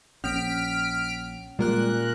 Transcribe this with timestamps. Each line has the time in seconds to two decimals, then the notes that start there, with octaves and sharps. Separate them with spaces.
0.24 A#1 C#4 F6 B6 D7
1.59 A#2 G3 G#3 A#4 F#6